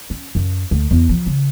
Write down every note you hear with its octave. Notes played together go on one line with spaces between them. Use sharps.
C#4
F#2
D2
E2
F3
C#3